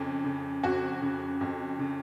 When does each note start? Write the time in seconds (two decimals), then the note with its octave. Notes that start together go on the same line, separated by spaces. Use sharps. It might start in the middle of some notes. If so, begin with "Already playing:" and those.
Already playing: F2 C#3
0.24 C#3
0.63 F2 F#4
1.02 C#3
1.41 F2
1.79 C#3